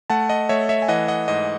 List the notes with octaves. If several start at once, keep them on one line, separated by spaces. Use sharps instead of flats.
A3 F#5 A5
D#5 F#5
A3 C#5 E5
C#5 E5
G#5
E3 D#5 F#5
D#5 F#5
G#2 D#5